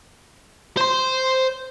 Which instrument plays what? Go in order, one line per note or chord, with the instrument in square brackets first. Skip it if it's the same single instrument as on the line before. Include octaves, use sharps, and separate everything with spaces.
[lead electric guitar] C5 C6